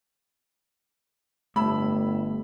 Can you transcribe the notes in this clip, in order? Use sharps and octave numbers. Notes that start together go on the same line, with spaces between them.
G1 A2 B5 E6